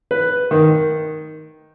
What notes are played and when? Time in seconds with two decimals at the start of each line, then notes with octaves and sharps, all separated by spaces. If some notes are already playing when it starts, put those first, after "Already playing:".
0.11 B4
0.51 D#3